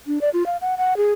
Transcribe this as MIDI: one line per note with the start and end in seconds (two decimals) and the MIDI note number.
0.07 0.21 62
0.21 0.29 74
0.34 0.45 65
0.46 0.57 77
0.61 0.75 78
0.77 0.96 78
0.97 1.12 68